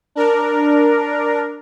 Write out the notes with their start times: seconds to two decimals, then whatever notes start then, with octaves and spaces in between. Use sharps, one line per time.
0.15 D4 A#4